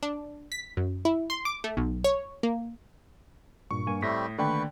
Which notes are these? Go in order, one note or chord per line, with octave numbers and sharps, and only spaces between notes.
D4
B6
F#2
E4
C6
D6
A3
B1
C#5
A#3
G2 A#2 C#6
G2 A#3 G#5
A2 G3 A3 C4 D#6 A#6 B6
D3 D#3 A3 A#3 B4 D5 G5 C#6